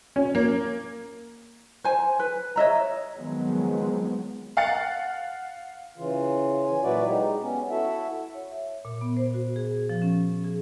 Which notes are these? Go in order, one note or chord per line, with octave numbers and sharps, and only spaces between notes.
C#4
A#3
C5 G#5
B4
C#5 D#5 E5 A#5
D#3 F3 F#3 G#3 B3 C4
F5 F#5 A6 C#7
C#3 E3 F4
G#5
A#2 F#3 E4 F#4 B4 D5
G#3 D#4 G4
B3 C#4
E4 F#4 A4 E5
C#5
E5
A#2
B3
C5
F#4
G#4
F3
C#4
G#4